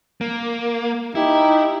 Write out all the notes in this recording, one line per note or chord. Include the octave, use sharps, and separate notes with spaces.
A#3
D#4 E4 G4